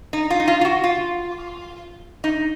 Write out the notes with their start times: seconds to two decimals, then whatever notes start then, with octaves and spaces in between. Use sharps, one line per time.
0.13 D#4
0.30 F4
0.40 D#4
0.48 F4
0.61 F4
0.65 F#4
0.84 F4
2.24 D#4